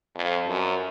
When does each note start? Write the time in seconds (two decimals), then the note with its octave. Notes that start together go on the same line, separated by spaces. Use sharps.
0.15 F2
0.48 F#2